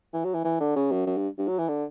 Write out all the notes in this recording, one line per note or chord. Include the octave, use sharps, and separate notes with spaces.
E3
F#3
E3
E3
D3
C#3
F#2
F#2
G2
G2
F#3
E3
D3